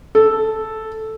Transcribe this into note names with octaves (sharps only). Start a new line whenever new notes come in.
A4